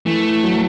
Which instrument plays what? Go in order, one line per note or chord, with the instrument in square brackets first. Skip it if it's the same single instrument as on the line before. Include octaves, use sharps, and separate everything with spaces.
[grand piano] E3 [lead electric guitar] A3
[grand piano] F#3